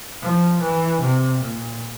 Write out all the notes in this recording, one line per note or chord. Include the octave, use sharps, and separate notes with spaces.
F3
E3
C3
A#2